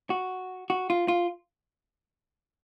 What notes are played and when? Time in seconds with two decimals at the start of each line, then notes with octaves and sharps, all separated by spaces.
0.10 F#4
0.70 F#4
0.90 F4
1.08 F4